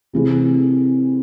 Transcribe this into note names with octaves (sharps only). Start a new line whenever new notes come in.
C3 E3 A3 C4 G#4